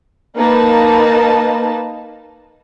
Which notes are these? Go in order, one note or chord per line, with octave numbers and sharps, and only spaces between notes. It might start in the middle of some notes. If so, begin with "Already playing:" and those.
A#3 D#4 B4 A5